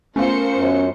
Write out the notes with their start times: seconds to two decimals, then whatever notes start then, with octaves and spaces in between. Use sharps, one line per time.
0.16 A3 B3 C#4 F4 A#4 C5 C#7
0.57 F#2